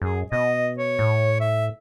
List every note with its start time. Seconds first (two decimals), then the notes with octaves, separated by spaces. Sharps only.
0.02 F#2 G#4
0.32 B2 D#5
0.79 C#5
0.99 A2
1.41 E5